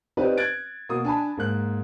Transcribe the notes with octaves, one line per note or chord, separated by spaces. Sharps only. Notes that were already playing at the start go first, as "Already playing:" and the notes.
C4 D#4 F4 G4 B4 D5
F#6 G#6 A6 D7
B2 A#3 D#6
D4 G#5 A5 B5
G#2 A#3 F#6